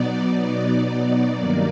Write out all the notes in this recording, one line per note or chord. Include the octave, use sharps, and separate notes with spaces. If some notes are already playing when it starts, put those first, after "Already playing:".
Already playing: B2 F#3 B3 D#4 D5
G2 D#3 F#3 A#3 D#4